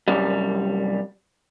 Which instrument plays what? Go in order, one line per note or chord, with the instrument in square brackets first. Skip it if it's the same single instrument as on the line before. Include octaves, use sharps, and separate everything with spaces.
[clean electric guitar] C2 F#2 G3